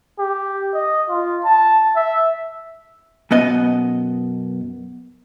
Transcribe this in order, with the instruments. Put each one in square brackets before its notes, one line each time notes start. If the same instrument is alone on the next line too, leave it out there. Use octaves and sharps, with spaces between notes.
[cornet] G4
D#5
F4
A5
E5
[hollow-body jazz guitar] F#2 B2 B3 D#5